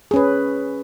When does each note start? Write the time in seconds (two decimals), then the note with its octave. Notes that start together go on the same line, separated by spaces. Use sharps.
0.11 G#4
0.14 C#4
0.16 B4